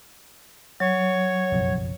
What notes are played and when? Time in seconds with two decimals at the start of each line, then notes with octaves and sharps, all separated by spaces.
0.80 F#3 C#5
1.52 F#1 B1 F2